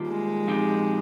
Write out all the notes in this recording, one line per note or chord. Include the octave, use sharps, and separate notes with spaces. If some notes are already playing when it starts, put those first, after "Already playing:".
Already playing: D#3 G3 A#3 F4
G#3
A#2 F3 C4 D#4 G4